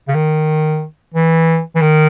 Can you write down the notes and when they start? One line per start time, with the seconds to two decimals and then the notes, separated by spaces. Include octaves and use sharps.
0.08 C#3
0.14 D#3
1.14 E3
1.75 E3
1.81 D#3